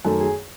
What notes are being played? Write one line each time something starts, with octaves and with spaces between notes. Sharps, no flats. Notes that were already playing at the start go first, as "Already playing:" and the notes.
F#2 D#3 A3 A4
G#4